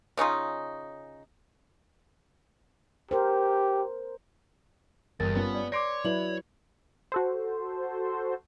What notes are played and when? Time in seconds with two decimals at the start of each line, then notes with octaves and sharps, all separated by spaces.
0.17 C#3 C#4 D#4 F4
3.11 G4 A#4 C5
5.20 G1 E2 A#4 A6
5.35 G2 B3 C#4 F4 B4
5.55 D5
5.72 C#5 D5 C6 D6 A#6 C7 D7
6.05 F#3 E4 B4 D5 F#7
7.12 F#4 A4 C5